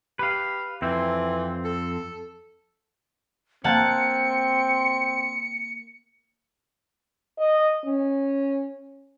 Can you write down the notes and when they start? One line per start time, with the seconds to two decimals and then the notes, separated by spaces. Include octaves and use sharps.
0.19 G4 B4 F5
0.82 F2 E3 C4
1.65 A4
3.64 A#3 C4 F#5 A5 C#7
7.38 D#5
7.85 C#4